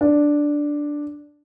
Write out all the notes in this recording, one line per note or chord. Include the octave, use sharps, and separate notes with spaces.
D4